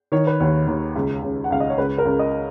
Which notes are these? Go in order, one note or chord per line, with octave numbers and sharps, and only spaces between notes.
D#3 C#5
B4
D#2 C#5
D#2
C#2
C#2
F#5
C#2 F5
D#5
C#5
C#2 B4
A#4
C#2
D#5